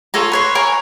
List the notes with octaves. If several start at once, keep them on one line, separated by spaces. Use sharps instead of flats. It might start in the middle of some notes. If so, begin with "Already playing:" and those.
F4 A4 C#5 A#5
B4 C#5 C6
A#4 C#5 G#5